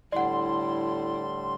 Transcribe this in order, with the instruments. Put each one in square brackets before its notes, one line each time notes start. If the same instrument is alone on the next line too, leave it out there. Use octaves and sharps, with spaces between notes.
[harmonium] A2 D3 G3 [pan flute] E4 [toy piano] D5 F#5 [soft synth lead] C6